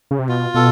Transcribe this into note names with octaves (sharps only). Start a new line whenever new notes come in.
C#3
C3
B2 F4
B2 A4